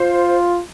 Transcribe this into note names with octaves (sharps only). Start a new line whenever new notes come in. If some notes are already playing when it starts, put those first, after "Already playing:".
Already playing: F4 C5